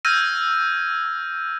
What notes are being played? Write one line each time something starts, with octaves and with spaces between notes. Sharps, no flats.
E6 F6 G6 G#6 A#6 D#7